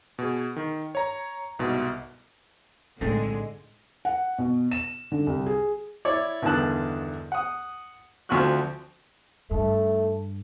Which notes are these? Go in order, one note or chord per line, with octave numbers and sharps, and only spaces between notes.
B2 G#4
D#3
C#5 A#5
C2 G#2 B2
B1 A2 D3 G#3 A3 C4 D#4
F#5
B2
E7
D3
C2
G#4
E4 C#5 D5
E2 G2 D3 D#3 A5 F#6
F#5 D#6
D2 F3 C4 F#4 C#6 F#6
G2 A3